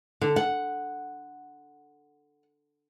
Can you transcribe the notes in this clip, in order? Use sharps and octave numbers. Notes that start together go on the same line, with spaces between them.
D3
F#5